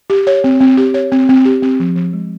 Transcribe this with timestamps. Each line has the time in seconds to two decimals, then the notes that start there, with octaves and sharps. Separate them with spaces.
0.10 G4
0.27 C#5
0.44 C4
0.61 C4
0.77 G4
0.94 C#5
1.12 C4
1.29 C4
1.45 G4
1.63 C4
1.80 F3
1.96 F3
2.13 G#3